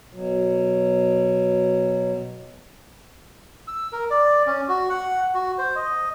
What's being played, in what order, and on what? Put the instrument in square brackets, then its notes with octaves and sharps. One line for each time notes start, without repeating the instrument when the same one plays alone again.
[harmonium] B2 F#3
[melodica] E6
A#4
D5
C#4
F#4
F#5
F#4
C5
D#5